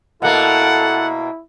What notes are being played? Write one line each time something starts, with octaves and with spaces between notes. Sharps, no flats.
B2 A#3 E4 A4 F#5